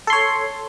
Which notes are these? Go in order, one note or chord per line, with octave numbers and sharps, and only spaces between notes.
A4 C#5 C6